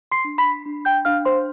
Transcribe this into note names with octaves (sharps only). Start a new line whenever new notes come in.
C6 C7
D4
B5 B6
D4
G5 G6
D4 F5 F6
C5 C6